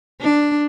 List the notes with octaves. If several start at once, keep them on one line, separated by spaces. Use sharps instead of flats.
D4